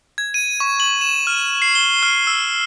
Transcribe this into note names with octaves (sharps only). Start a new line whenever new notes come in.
G#6
D#7
C#6
F#7
E7
F6
C7
G7
F6
E6